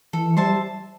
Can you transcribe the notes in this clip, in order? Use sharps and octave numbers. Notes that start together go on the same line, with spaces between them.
E3 A4
G3 C5 E5 A5